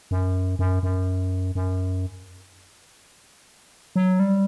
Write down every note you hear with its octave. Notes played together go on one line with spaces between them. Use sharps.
F#2
F#2
F#2
F#2
F#3
G3